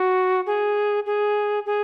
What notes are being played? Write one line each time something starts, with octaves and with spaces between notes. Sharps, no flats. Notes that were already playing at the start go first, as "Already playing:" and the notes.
Already playing: F#4
G#4
G#4
G#4